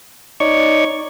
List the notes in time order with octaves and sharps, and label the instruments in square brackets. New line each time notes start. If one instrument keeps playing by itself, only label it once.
[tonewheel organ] D#4 C#5 D5 C#6